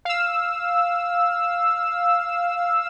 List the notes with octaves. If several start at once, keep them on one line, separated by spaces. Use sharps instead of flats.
F5 E6